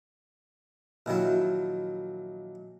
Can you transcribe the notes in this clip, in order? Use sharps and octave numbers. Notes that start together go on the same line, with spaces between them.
A#1 D#3 F#3 E4